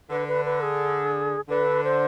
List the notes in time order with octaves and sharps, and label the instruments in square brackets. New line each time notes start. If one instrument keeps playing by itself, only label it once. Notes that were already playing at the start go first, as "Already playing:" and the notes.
[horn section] D3 [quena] B4
[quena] B4
B4
G#4
[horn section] D3 [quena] B4
[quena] C5